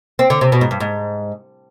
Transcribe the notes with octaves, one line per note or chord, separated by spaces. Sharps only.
C4
D3
C3
B2
G#2
G2
G#2